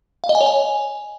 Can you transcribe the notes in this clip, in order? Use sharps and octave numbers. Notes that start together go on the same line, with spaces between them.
F5
D#5
G#5
C#5
G#5